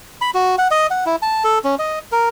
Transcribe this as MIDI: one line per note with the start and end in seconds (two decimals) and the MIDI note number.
0.21 0.31 83
0.34 0.56 66
0.58 0.68 78
0.71 0.87 75
0.91 1.05 78
1.06 1.16 64
1.22 1.43 81
1.44 1.59 69
1.64 1.75 61
1.79 1.99 75
2.12 2.29 70